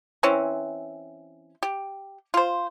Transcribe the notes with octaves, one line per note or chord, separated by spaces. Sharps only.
E3 C4 C#4
G4
F4 C5